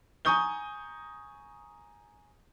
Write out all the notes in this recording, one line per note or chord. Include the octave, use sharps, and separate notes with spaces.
G#5 A#5 C#6 D#6 G6 G7